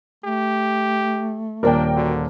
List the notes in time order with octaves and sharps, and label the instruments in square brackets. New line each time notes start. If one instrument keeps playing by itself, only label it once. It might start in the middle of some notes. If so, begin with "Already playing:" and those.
[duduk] A3 [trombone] G4
[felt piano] D#1 A#3 [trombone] D4 [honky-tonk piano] A#4 D5 G5
[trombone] D3 [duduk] F#4